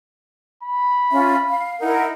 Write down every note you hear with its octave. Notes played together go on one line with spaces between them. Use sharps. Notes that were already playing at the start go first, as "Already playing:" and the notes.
B5
C#4 F4 E5
F5
D#4 E4 A#4 F#5